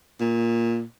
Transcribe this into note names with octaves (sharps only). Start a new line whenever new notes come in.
A#2